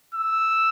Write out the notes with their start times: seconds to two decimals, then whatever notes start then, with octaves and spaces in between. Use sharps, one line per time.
0.15 E6